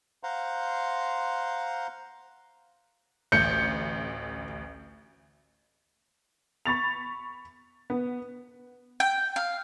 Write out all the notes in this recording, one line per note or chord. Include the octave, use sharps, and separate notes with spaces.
C5 F5 F#5 A#5 C6
A1 D2 G6 C#7
B5 C#6 A6 F7
B3
G5
F5